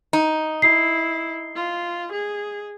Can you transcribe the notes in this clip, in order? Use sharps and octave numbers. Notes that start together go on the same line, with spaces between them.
D#4
E4 C7
F4
G#4